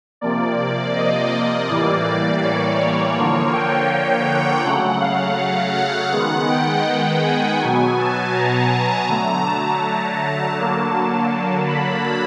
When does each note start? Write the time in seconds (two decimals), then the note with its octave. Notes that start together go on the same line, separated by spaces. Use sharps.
0.21 C3 F3 A#3 D5
0.96 D#5
1.68 A2 E3 G3 A#3 D5
2.43 C#5
2.80 C#5
3.17 D3 F3 A#3
3.53 G5
4.28 F#5
4.65 C#3 F#3 A3 F#5
5.01 F5
5.75 F#5
6.12 D#3 G#3 B3
6.49 G5
7.23 G#5
7.60 B2 F#3 B3
7.98 A5
8.35 A#5
9.08 D3 F#3 A3
9.45 A5
10.56 D3 F#3 A#3
11.67 B5